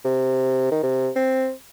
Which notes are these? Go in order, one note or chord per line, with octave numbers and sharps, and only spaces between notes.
C3
D#3
C3
C4